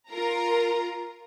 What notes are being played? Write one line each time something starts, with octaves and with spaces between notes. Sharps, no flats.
F4 A#4 A#5